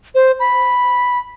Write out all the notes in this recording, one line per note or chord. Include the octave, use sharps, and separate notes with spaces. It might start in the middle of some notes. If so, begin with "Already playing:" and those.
C5
B5